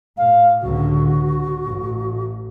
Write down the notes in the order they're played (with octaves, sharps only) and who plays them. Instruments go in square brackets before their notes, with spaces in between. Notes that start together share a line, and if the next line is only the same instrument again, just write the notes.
[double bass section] A2 [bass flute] F5
[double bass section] C#2 A2 D3 [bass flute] F#4
[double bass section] A1